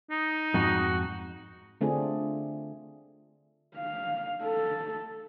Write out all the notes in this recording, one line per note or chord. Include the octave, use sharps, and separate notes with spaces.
D#4
F2 G#2 F#4
D3 A3 C4 D4 F4 G#4
F5
A4